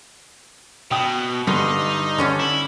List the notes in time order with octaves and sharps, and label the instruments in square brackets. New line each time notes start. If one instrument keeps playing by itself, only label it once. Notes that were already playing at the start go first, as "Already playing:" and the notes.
[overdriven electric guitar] B2 [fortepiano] G5 D#6
[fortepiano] G2 [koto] D3 [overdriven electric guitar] D#4 D#5
[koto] D3 C#4 D4
[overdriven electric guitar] E4